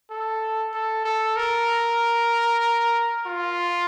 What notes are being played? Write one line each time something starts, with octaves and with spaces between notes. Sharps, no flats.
A4
A4
A4
A#4
F4